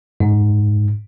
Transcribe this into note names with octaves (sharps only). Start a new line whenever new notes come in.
G#2